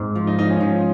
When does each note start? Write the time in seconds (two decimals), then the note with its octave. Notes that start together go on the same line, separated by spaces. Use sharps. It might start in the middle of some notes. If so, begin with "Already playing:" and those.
Already playing: G#2 C4
0.15 F3
0.27 D#4
0.38 F3 D#4
0.50 C#4
0.61 F3